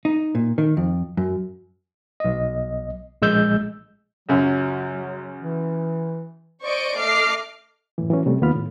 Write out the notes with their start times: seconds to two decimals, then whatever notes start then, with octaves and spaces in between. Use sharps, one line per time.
0.05 D#4
0.35 A#2
0.58 D#3
0.77 F2
1.17 F#2
2.20 B1 D#5
3.22 A#1 G#3 E6 G6
4.29 C#2 F#2 F#3
5.40 E3
6.62 C5 D5 D#5 C#6 D7
6.98 A3 D#5 D6 F6 C7
7.98 F#2 A2 E3
8.10 E3 F#3 C#4
8.26 C3 G3 A3
8.42 D#2 B3 F4 B5 F6
8.56 A2